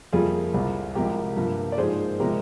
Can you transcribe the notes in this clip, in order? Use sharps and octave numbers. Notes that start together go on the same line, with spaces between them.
F2 C3 G3 A#3 F4 G#4
C2 C3 G3
C2 C3 F3 G#3 G4 A#4
G2 F3 A#3
D5
G#2 F3 A#3 G#4 C5
C3 F3 G#3 G4 A#4